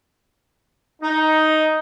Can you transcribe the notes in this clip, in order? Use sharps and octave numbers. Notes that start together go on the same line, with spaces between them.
D#4